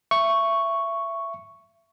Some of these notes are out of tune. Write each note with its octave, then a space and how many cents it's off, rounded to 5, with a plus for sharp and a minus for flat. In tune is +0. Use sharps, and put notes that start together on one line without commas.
E5 +25 C#6 +0